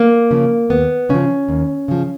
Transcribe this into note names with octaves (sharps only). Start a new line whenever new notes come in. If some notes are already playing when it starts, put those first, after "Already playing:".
Already playing: A#3
C#3 F3
D#2 B3
C#3 F3 C#4
D#2
C#3 F3